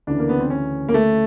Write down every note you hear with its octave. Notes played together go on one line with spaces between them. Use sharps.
D2 C#3 E3 D4
A#3
B3
C4
C#4
A#3
A3